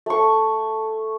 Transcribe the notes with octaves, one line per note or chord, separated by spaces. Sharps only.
A3 C#6